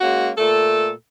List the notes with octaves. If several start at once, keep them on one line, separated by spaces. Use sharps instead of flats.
G#3 A#3 C#4 F#4
A#2 A3 A4